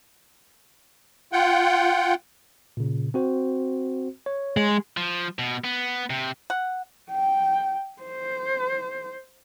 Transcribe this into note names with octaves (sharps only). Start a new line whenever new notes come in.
F4 F#5 G5
A#2 C#3
C4 F#4 C5
C#5
G#3
F3
B2
B3
C3
F#5
G5
C5